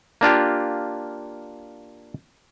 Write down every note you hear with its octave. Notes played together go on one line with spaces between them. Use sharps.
A#3 D4 F4 G4